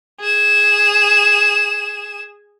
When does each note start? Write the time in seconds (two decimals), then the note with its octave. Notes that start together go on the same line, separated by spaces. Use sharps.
0.20 G#4 E7